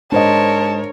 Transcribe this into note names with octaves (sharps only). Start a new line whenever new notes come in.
G#2 D4 A#4 C5 C#5 D#5 A5